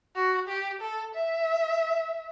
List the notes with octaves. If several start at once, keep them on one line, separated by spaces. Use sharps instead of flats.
F#4
G4
A4
E5